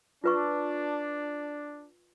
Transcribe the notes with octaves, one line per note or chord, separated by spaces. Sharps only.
D4 F4 B4 C#6